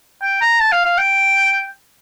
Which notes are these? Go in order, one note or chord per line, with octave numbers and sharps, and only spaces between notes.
G5
A#5
A5
F5
F5
G5